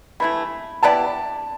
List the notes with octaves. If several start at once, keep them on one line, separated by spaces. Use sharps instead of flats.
E3 A3 E4 B5
B3 E4 G4 D5 A5